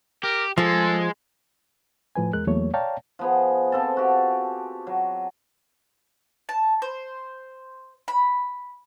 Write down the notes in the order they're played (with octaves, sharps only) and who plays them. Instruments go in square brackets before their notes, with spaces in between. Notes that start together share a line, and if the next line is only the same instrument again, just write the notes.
[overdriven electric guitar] G4 [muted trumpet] A#4
[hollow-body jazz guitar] F3 [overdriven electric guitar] G#3 [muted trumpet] A4
[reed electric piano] A2 F3 B4 G#5
E2 G#3 A#4 F#6
E2 F#3 A3 A#3 C#5
C#5 D5 F5 G5 A5 A#5
[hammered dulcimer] F3 B3 G#4
F3 C4 A4 A5
F#4 G4
F#3
[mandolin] A5
C5
B5